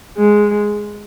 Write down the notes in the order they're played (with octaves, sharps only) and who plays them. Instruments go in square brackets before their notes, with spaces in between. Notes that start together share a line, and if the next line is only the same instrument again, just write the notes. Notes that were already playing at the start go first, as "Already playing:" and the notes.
[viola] G#3